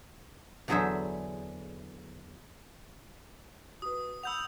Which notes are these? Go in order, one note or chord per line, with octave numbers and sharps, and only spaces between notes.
E2 D3 F#3 G#4 C5 E5
F#4 B4 D#6
F#5 B5 E6 G6 F7